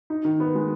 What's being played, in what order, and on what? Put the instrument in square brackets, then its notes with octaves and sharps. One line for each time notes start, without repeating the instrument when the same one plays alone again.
[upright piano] D#4
D#3
B3
G#3